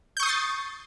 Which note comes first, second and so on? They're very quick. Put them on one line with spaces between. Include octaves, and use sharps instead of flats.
G6 C#6 D#6 C7 A6